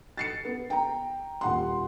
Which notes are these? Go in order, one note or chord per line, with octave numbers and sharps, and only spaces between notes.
A6 C7 C#7
B3
G5 A#5
D#1 F#5 C6